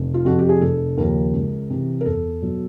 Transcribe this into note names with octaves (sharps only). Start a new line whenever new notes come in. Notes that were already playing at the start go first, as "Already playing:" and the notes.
Already playing: F1
F4
F2 C3 F3 F#4
G4
G#4
F1 A4
D#2 C#3 F3 A#4
C#2
C3 E3
A#4
E2 A4
B2 F#3